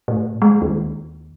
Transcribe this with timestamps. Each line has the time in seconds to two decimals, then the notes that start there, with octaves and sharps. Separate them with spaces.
0.08 A2
0.42 G#3
0.62 D#2